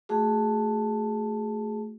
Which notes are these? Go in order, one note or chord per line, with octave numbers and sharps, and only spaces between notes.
A3 F#4 G#4